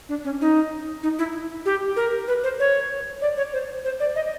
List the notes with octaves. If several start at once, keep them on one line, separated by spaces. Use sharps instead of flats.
D4
C#4
D#4
D#4
E4
G4
A#4
B4
C5
C#5
D5
C#5
C5
C5
D5
D#5